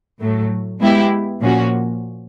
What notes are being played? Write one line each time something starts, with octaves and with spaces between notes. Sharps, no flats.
A2 F#3 A3
G#3 B3 E4 G4
A#2 F3 A#3 C#4 F#4